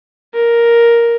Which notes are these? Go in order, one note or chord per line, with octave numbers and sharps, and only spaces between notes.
A#4